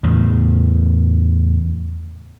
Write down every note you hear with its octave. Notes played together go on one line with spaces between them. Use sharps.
E2 A2 C#3